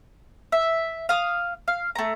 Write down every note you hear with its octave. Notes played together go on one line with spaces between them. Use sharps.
E5
F5 D#6
F5
A3 A#5